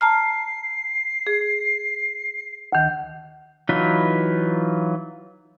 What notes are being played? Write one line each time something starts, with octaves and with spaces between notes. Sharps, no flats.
A5 A#5 F6 C7
G#4
D2 D#3
E3 F#3 D#4 F4 B4